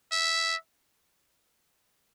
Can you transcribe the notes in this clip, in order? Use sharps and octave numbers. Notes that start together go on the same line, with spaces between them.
E5